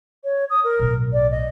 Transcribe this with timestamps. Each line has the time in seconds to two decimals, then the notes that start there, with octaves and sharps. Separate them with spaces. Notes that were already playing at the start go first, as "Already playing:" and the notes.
0.24 C#5
0.49 D#6
0.64 A#4
0.79 B1 A2
1.12 D5
1.30 D#5